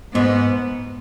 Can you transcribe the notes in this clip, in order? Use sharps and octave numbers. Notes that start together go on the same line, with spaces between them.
G#2 B3